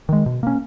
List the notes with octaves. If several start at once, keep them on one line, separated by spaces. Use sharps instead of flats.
D#3 G#3
B2
A#3 C#4